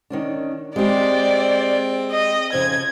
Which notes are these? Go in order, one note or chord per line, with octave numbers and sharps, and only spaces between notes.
D#3 C#4 D4
G#3 C4 G4 D5
D#5
F2 C#3 F3 G#6